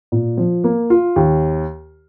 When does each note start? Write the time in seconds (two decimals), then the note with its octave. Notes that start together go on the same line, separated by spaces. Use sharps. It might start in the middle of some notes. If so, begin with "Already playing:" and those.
0.12 A#2
0.37 F3
0.64 A#3
0.90 F4
1.16 D#2